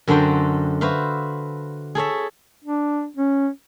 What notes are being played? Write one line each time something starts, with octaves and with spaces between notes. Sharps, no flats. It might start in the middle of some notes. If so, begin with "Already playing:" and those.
F#2 D3 F#4 A4 C5 G5
F#4 B4 C5 E5 F5
G#4 A4 C#5 E5
D4
C#4